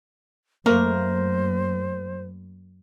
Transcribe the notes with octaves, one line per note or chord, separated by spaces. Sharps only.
F#2 A3 A#3 A#4 C5